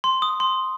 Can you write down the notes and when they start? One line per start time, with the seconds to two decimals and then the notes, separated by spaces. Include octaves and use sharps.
0.04 C6
0.22 D#6
0.40 C6